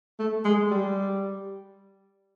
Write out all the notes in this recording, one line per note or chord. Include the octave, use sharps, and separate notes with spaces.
A3
G#3
G3